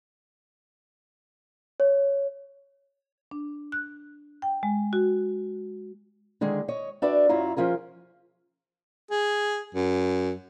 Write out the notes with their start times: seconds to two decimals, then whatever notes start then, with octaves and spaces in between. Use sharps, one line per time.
1.80 C#5
3.31 D4
3.72 F#6
4.42 G5
4.63 G#3
4.93 F#4
6.41 D3 D#3 G#3 G#4
6.68 C#5 D#5
7.02 D4 F#4 B4 D5 E5
7.29 F#2 F#3 E4 F4 A#5
7.57 F3 C#4 F4 G#4 A#4
9.11 G#4
9.75 F#2